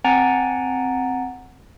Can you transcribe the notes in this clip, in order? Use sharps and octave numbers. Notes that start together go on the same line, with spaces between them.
C4 F#5 G#5 A#5 A6 D7